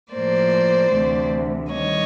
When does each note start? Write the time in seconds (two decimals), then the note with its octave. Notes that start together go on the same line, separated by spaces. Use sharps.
0.13 A2 F3 A#3 C5 D5
0.93 D2 C3 E3 A3
1.72 D#3 G3 C#5 D#5